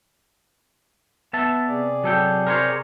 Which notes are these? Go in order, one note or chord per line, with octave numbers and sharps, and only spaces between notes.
B3 E5 A5
C3 G#4 D5
F#3 A4 G5
A#4 C5 C#5